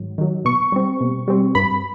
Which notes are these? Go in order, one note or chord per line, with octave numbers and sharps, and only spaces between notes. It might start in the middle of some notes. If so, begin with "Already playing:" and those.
Already playing: G#2 D#3 F#3
D#3 F#3
B2 C#6
G3 C4
B2
G3 C4
G2 B5